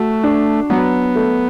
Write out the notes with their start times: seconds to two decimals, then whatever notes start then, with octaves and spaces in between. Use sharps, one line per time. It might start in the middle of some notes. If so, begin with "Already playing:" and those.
Already playing: A3 F#4
0.23 D4
0.70 F#3 B3
1.15 A3